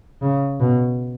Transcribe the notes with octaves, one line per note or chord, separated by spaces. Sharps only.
C#3
B2